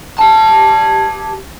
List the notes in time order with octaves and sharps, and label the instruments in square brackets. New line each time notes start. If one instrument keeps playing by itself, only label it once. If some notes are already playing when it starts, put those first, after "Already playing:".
[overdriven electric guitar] G4 A5